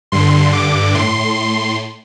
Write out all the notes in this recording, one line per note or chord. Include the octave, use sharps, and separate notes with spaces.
G2 D3 C6
D6
A2 C6
C6